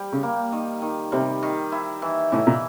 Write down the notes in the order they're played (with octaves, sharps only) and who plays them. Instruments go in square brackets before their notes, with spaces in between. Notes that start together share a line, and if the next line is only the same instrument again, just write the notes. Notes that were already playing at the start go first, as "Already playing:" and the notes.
Already playing: [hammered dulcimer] G3
[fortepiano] C#3
[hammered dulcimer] A#3
D#3
D#3
[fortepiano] C3 [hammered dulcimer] G3
[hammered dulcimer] D#3
E4
E3
[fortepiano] A2 [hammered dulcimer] E3
[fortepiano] A#2